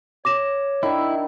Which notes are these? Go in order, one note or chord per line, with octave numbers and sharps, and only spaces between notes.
C#5 D6 A#6 E7
D#3 D4 E4